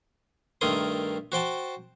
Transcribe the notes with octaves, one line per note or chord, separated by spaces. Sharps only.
G2 D#3 A3 A#4 C6 D#6
F#4 C5 G5 A5